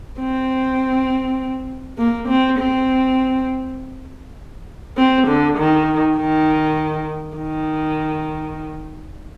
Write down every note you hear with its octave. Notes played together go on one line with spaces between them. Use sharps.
C4
A#3
C4
C4
C4
D3
D#3
D#3
D#3